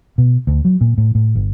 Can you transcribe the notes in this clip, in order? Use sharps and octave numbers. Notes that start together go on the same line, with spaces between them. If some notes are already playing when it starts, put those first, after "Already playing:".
B2
D2
F#3
A#2
A2
A2
G1